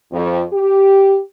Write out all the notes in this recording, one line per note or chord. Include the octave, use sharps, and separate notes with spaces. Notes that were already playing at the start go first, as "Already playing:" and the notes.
F2
G4